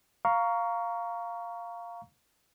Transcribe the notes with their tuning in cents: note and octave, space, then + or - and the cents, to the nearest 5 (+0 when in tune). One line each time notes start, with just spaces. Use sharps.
F5 +0 A#5 +0 C#6 +20